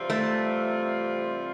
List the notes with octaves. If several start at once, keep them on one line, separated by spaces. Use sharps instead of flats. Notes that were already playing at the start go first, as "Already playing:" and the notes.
Already playing: C3 E3 G3 C4 F4
A3